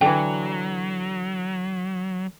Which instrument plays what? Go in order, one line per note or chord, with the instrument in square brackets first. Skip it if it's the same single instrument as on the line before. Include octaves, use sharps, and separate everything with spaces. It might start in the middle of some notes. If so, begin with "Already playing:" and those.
[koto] D3 E3 [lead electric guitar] F#3 [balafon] G5